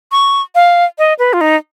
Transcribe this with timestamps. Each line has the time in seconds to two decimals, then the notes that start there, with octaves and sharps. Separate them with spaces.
0.12 C#6
0.55 F5
0.98 D#5
1.19 B4
1.33 F4
1.41 D#4